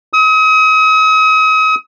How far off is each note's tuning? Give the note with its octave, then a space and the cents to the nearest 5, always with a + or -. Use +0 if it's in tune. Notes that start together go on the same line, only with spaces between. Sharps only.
D#6 +40